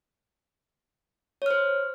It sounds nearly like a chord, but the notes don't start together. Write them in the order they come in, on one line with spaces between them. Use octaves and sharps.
C#5 F6 C5